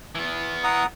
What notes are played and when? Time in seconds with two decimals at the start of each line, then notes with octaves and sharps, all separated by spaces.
0.15 E3 B3
0.64 F#5 A#5 D#6